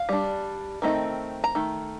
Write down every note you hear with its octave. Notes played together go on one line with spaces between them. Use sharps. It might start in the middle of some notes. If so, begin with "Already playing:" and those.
Already playing: F5
G3 D4
D#3 A3 C4 D#4
A#5
D#3 A3